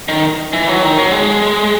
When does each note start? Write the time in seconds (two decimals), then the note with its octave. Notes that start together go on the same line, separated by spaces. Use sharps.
0.08 D#3
0.53 E3
0.68 F#3
0.82 D#3
0.98 F#3
1.12 G#3